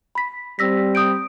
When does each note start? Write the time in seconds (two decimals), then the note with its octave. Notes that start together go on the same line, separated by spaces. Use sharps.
0.15 B5 B6
0.59 G3 C4 E6 A#6 B6
0.95 D#6 G6 D7